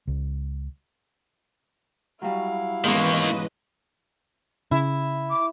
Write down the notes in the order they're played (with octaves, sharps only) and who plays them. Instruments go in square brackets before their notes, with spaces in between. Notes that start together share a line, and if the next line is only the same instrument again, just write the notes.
[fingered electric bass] C#2
[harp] F#3 G3 [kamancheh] E4 F5
[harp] G#2 B2 C#4 [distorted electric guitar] D#3 A#3 [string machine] E3 B4 D#5
[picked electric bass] C#3 [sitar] E4
[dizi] D6